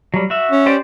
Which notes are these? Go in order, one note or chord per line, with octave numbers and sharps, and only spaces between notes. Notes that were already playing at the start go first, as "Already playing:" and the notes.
F#3 G3
F#4 E5
C#4
G4 C5 D5